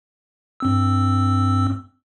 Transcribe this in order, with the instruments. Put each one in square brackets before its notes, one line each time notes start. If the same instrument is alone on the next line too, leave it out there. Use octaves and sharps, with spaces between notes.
[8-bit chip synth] G2 C4 E6